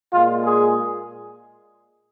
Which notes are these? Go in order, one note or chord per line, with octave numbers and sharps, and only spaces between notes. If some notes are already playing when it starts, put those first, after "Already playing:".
A#2 G#3 F4
G#4